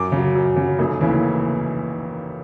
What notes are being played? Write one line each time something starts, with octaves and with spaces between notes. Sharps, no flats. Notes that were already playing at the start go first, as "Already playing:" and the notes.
Already playing: F#2 D6
C#3 F#3
F#2
C#3
F#3
F1
D#2 C#3 E3